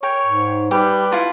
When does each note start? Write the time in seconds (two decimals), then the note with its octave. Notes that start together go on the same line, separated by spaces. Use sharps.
0.03 A#4 C#5 G5
0.26 G#2
0.71 G3 G4 B4
1.11 E4 F4 A5